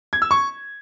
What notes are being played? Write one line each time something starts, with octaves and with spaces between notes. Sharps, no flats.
G#6
E6
C#6